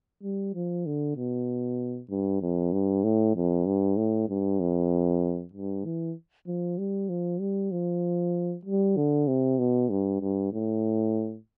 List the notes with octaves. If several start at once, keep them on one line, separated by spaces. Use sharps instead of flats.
G3
F3
D3
B2
G2
F2
G2
A2
F2
G2
A2
G2
F2
G2
E3
F3
G3
F3
G3
F3
G3
D3
C3
B2
G2
G2
A2